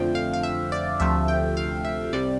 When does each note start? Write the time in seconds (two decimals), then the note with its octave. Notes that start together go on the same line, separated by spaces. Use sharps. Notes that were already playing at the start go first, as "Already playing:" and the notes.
Already playing: F2 D3 F3 A3 G5
0.15 F5
0.33 F5
0.43 E5
0.72 D5
1.00 D2 C3 F3 A3 E5
1.28 G5
1.57 F5
1.85 E5
2.13 C2 C3 G3 D5